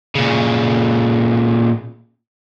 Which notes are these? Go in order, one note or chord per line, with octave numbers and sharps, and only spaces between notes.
A#2 C#3